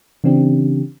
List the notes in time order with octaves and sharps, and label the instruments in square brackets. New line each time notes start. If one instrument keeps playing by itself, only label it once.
[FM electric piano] C#3 E3 C4 D4 G4